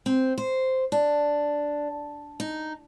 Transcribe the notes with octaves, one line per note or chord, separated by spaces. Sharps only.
C4
C5
D4
D#4